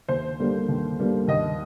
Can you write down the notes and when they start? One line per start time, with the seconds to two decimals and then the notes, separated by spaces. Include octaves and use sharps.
0.08 D#2 C5
0.39 D3 G3 A#3
0.68 D#2
0.99 D3 G3 A#3
1.28 D#2 D#5